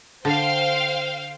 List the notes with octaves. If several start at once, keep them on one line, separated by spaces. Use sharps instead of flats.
D3 C5 F5 G5